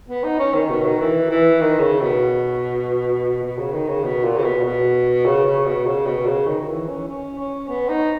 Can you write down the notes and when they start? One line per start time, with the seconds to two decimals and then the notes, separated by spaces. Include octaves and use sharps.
0.09 B3
0.24 D#4
0.39 C#4
0.54 D#3
0.70 B2
0.85 D#3
1.00 E3
1.30 E3
1.61 D#3
1.81 C#3
2.01 B2
3.43 B2
3.58 C#3
3.74 D#3
3.88 C#3
4.04 B2
4.24 A#2
4.37 C#3
4.44 B2
4.64 B2
5.26 C#3
5.46 C#3
5.66 B2
5.86 C#3
6.06 B2
6.26 C#3
6.47 D#3
6.67 E3
6.87 C#4
7.08 C#4
7.38 C#4
7.69 B3
7.89 D#4